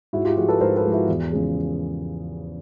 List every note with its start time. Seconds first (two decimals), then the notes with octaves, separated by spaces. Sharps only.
0.13 G#2 E4 F#4
0.25 F4 G4
0.37 F3 G#3 F#4 G#4
0.48 A4 B4
0.61 G#2 A#4 C5
0.77 A4 B4
0.85 F3 G#3
0.92 E4 F#4
1.08 E2
1.32 C#3 F3 G#3